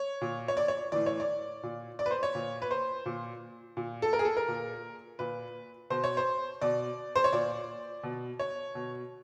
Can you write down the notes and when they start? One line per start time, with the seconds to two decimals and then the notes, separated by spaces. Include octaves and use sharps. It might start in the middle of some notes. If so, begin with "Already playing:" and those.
Already playing: C#5
0.21 A#2
0.48 C#5
0.57 D5
0.68 C#5
0.92 A2 E3 D5
1.06 C#5
1.20 D5
1.63 A#2
1.99 D5
2.06 B4
2.11 C5
2.23 C#5
2.35 A#2
2.62 B4
2.71 C5
3.06 A#2
3.77 A#2
4.02 A4
4.13 A#4
4.19 G#4
4.25 A4
4.37 A#4
4.48 A#2
5.19 A#2 B4
5.90 B2 C5
6.04 C#5
6.17 C5
6.61 B2 D5
7.16 C5
7.24 C#5
7.33 A#2 D5
8.03 B2
8.39 C#5
8.75 B2